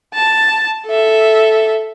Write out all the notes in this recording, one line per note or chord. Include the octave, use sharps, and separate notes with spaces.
A5
A4 E5